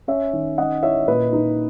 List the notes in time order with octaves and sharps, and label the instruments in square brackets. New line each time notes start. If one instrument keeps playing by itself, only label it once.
[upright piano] C#4 C#5 E5
D#3
C#4 D#5 F#5
E4 C#5 E5
A#2 B4 D#5
D#4